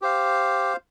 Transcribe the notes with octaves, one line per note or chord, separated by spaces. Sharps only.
G4 C5 F5